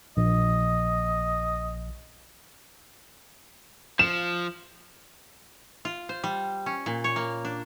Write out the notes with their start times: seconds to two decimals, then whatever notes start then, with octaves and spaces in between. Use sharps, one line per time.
0.17 A#1 D#5
3.99 F3 E7
5.85 F4
6.09 C5
6.24 G3
6.66 C#4
6.86 A#2
7.04 C#5
7.16 A#3
7.45 D4